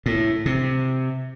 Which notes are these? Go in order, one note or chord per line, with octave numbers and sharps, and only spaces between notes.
A2
C3